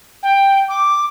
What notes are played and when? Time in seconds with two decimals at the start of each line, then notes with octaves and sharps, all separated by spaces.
0.23 G5
0.68 D6